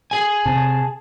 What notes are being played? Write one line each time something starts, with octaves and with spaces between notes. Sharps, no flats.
G#4 G#5
C3 A5